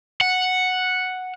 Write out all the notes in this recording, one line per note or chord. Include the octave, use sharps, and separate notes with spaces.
F#5